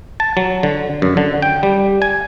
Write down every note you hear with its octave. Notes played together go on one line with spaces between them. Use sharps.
A5
F#3
D3
F#2
D3
G5
G3
G#5